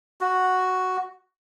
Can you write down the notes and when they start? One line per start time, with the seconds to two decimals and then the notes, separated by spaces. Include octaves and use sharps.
0.21 F#4